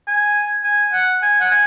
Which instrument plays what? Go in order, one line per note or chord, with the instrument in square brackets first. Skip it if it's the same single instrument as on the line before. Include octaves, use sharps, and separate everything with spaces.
[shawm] G#5
G#5
F#5
G#5
F#5
G#5